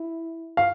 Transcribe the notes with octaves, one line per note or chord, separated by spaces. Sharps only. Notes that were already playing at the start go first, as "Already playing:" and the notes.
Already playing: E4
F5